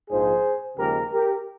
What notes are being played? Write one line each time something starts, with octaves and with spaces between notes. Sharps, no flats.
A#1 G#2 F3 G#4 C5
D#2 C#3 F3 G#3 G4 A#4
G4 A#4